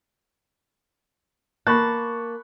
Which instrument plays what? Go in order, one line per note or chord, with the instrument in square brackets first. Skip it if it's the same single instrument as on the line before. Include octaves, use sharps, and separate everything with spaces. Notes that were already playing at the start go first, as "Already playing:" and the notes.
[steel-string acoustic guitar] A#3 A5 [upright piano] B5 C#6 F#6